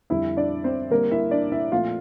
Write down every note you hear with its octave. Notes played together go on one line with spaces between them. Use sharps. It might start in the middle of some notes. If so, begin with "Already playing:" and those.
F2 D3 G3 E4 E5
D4 D5
C4 C5
D3 G3 A#3 C4 A#4
E4 E5
D4 D5
E4 E5
A#2 F3 A3 C4 F4 F5